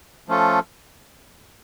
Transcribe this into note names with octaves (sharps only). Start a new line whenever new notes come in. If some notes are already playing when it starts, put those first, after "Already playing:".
F3 A3 C#4 F4 A4